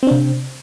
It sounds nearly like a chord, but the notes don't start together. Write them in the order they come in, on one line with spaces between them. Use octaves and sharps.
C4 D4 C3